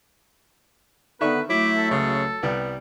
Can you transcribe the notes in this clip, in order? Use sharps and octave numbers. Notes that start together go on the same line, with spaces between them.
D3 D#3 B3 B4 E5 C#6
F#3 A3 E4 D6
A4
C#2 C#3
C2 G3 B3